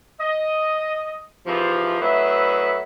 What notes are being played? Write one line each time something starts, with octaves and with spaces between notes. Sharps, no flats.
D#5
G#2 C3 E3 F3
F#3 A3 E4 B4 D#5 E5